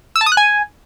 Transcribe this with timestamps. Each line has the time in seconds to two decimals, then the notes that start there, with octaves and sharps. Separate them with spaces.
0.16 E6
0.21 A5
0.26 D#6
0.32 F#6
0.37 G#5